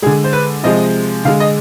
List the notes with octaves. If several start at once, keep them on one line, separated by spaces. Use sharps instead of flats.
D3 G#3 G#4
C5
B4
C3 F3 G#3 D#5
D3 G#3 F5
D#5